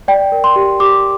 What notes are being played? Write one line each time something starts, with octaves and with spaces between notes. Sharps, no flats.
D5 G5
A#4
C6
G4
G4 D6